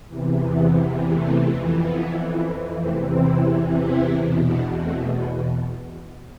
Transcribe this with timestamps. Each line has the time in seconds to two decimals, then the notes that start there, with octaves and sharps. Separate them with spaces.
0.09 E2 C3 E3
0.42 B3
1.10 A3
1.43 F2 E3
1.77 B3
2.78 E2 C3 E3 A3 C4
3.11 C4 E4
3.79 C4 E4
4.14 E2 B2
4.47 B3 D4
4.80 A3 C4
5.14 B3